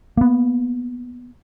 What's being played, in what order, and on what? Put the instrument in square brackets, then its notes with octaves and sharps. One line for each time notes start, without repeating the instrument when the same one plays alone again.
[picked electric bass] A#3 B3